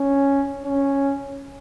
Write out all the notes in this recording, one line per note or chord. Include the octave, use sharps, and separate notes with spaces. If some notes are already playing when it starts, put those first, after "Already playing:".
Already playing: C#4
C#4